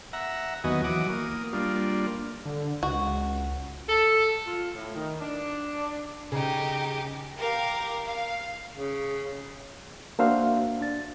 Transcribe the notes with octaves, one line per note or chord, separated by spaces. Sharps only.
E5 F#5 A#5
D#2 F#3 B3 F#4 D#5 G#5
E3 F#3 F#4 D6 D#6
A#3 D#6
G3 A#3 D4 F4
D3
C#2 F#4
A4
F4
A2
D#3
D4
C#3 D#4 G4
G4 A#4 F5
F5
C#3
A#3 D4 F#4 C5 E5 F5
D4 A6